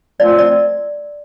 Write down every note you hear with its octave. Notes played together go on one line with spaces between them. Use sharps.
F3 A3 C4 F4 D5
D5